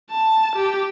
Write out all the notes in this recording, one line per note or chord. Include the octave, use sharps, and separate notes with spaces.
A5
G4